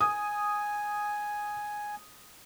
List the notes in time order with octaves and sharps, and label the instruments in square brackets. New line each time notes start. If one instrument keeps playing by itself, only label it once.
[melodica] G#5 [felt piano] D#6